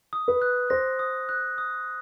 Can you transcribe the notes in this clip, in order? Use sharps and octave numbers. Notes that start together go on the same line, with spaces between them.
D#6
B4
F#6
C5 A#6
D#6
F#6
D#6